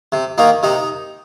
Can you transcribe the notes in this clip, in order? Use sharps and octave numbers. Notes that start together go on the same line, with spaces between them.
C3
D#3 A#3 D#4
C3 D#4